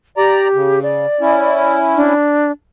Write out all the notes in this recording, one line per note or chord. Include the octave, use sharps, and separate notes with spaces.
G4 D5 A#5
C#3
D5
C#4 E4
D4